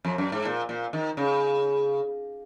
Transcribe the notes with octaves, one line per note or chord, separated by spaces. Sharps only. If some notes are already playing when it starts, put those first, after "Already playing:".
F2
F#2
G#2
A#2
A#2
D#3
C#3